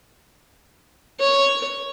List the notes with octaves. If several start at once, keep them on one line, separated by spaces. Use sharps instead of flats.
C#5